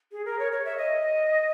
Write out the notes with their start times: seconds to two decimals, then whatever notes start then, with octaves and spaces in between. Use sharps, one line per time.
0.12 G#4
0.25 A#4
0.39 C#5
0.52 C#5
0.65 E5
0.77 D#5